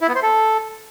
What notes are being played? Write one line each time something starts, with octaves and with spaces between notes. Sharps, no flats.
E4
B3
C5
A4